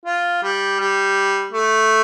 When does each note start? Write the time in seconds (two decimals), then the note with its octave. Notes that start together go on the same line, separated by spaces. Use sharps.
0.06 F4
0.43 G3
0.80 G3
1.52 A3